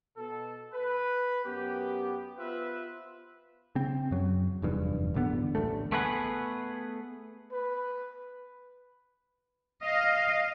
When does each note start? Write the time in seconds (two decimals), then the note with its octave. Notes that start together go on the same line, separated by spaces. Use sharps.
0.17 B2 A4
0.73 B4
1.45 F#2 B3 G4
2.39 B3 F4 B4 C5 E5
3.75 C#3 C4
4.11 F#2 F#3
4.62 F1 E2 G2
5.14 D1 A1 D3 B3
5.55 A1 D2 A3
5.92 A3 B3 G#4 B4 F#5
7.52 B4
9.82 D#5 F5